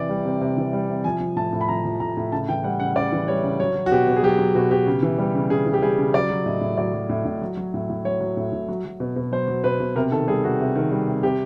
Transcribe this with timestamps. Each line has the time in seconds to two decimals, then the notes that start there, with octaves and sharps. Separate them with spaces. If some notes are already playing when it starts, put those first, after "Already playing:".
Already playing: C3 E3 D5
0.09 G3
0.25 C3
0.41 C3
0.57 E3
0.73 G3
0.89 C3
1.04 F3 G#5
1.20 F3
1.36 A2 A5
1.53 A2
1.61 B5
1.68 F3 A#5
1.84 F3
2.00 A2 A#5
2.17 A2
2.32 C#3 A5
2.48 E3 G5
2.64 G3 F#5
2.80 C#3 F#5
2.96 C#3 D5
3.12 E3
3.28 G3 C#5
3.43 C#3
3.60 F#3 C#5
3.75 F#3
3.86 F#4
3.91 B2 G4
4.08 B2
4.16 G#4
4.23 F#3 G4
4.39 F#3
4.55 B2 F#4
4.71 B2 G4
4.87 C#3
5.03 E3
5.18 G3
5.35 C#3
5.50 C#3 G#4
5.66 E3
5.74 G4
5.82 G3 G#4
5.98 C#3
6.14 F#3 D5
6.30 F#3
6.46 A2 D#5
6.61 A2
6.77 F#3 D5
6.93 F#3
7.09 A2
7.25 A2
7.41 F#3
7.57 F#3
7.74 A2
7.90 A2
8.05 F#3 C#5
8.20 F#3
8.37 A2
8.53 A2
8.68 F#3
8.85 F#3
9.00 B2
9.16 B2
9.32 F#3 C5
9.48 F#3
9.64 B2 B4
9.80 B2
9.96 C3 A#4
10.11 D#3 A4
10.28 G3 G#4
10.43 C3 F#4
10.60 C3
10.75 D#3
10.91 G3
11.07 C3
11.23 C3 G4